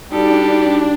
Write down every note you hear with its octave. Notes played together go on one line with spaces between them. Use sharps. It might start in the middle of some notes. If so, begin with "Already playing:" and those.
G3 D4 D#4 F#4 G4 A4